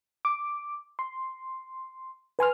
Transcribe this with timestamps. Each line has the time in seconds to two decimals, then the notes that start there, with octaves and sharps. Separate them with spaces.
0.25 D6
0.99 C6
2.39 B4 G#5 C6 F6